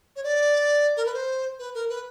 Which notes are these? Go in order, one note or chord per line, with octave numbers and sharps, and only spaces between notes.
C#5
D5
A#4
B4
C5
B4
A#4
B4